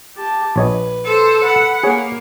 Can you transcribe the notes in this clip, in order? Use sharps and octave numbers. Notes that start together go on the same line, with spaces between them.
G4 A5
A#1 B4 C#5 D#5
A4 C5
F#5 B5
A#3 G#4 C#5